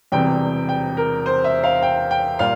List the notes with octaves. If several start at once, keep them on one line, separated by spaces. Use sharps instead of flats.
E1 E2 C3 G3 G5
G5
A#4
C5
E5
F5
G5
G5
A#2 G3 F5